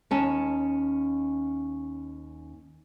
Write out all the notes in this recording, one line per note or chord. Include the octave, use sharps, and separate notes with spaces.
D#2 C#4 A5